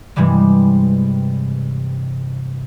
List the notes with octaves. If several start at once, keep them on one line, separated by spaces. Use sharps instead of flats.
G2 C3 E3 G3 G#3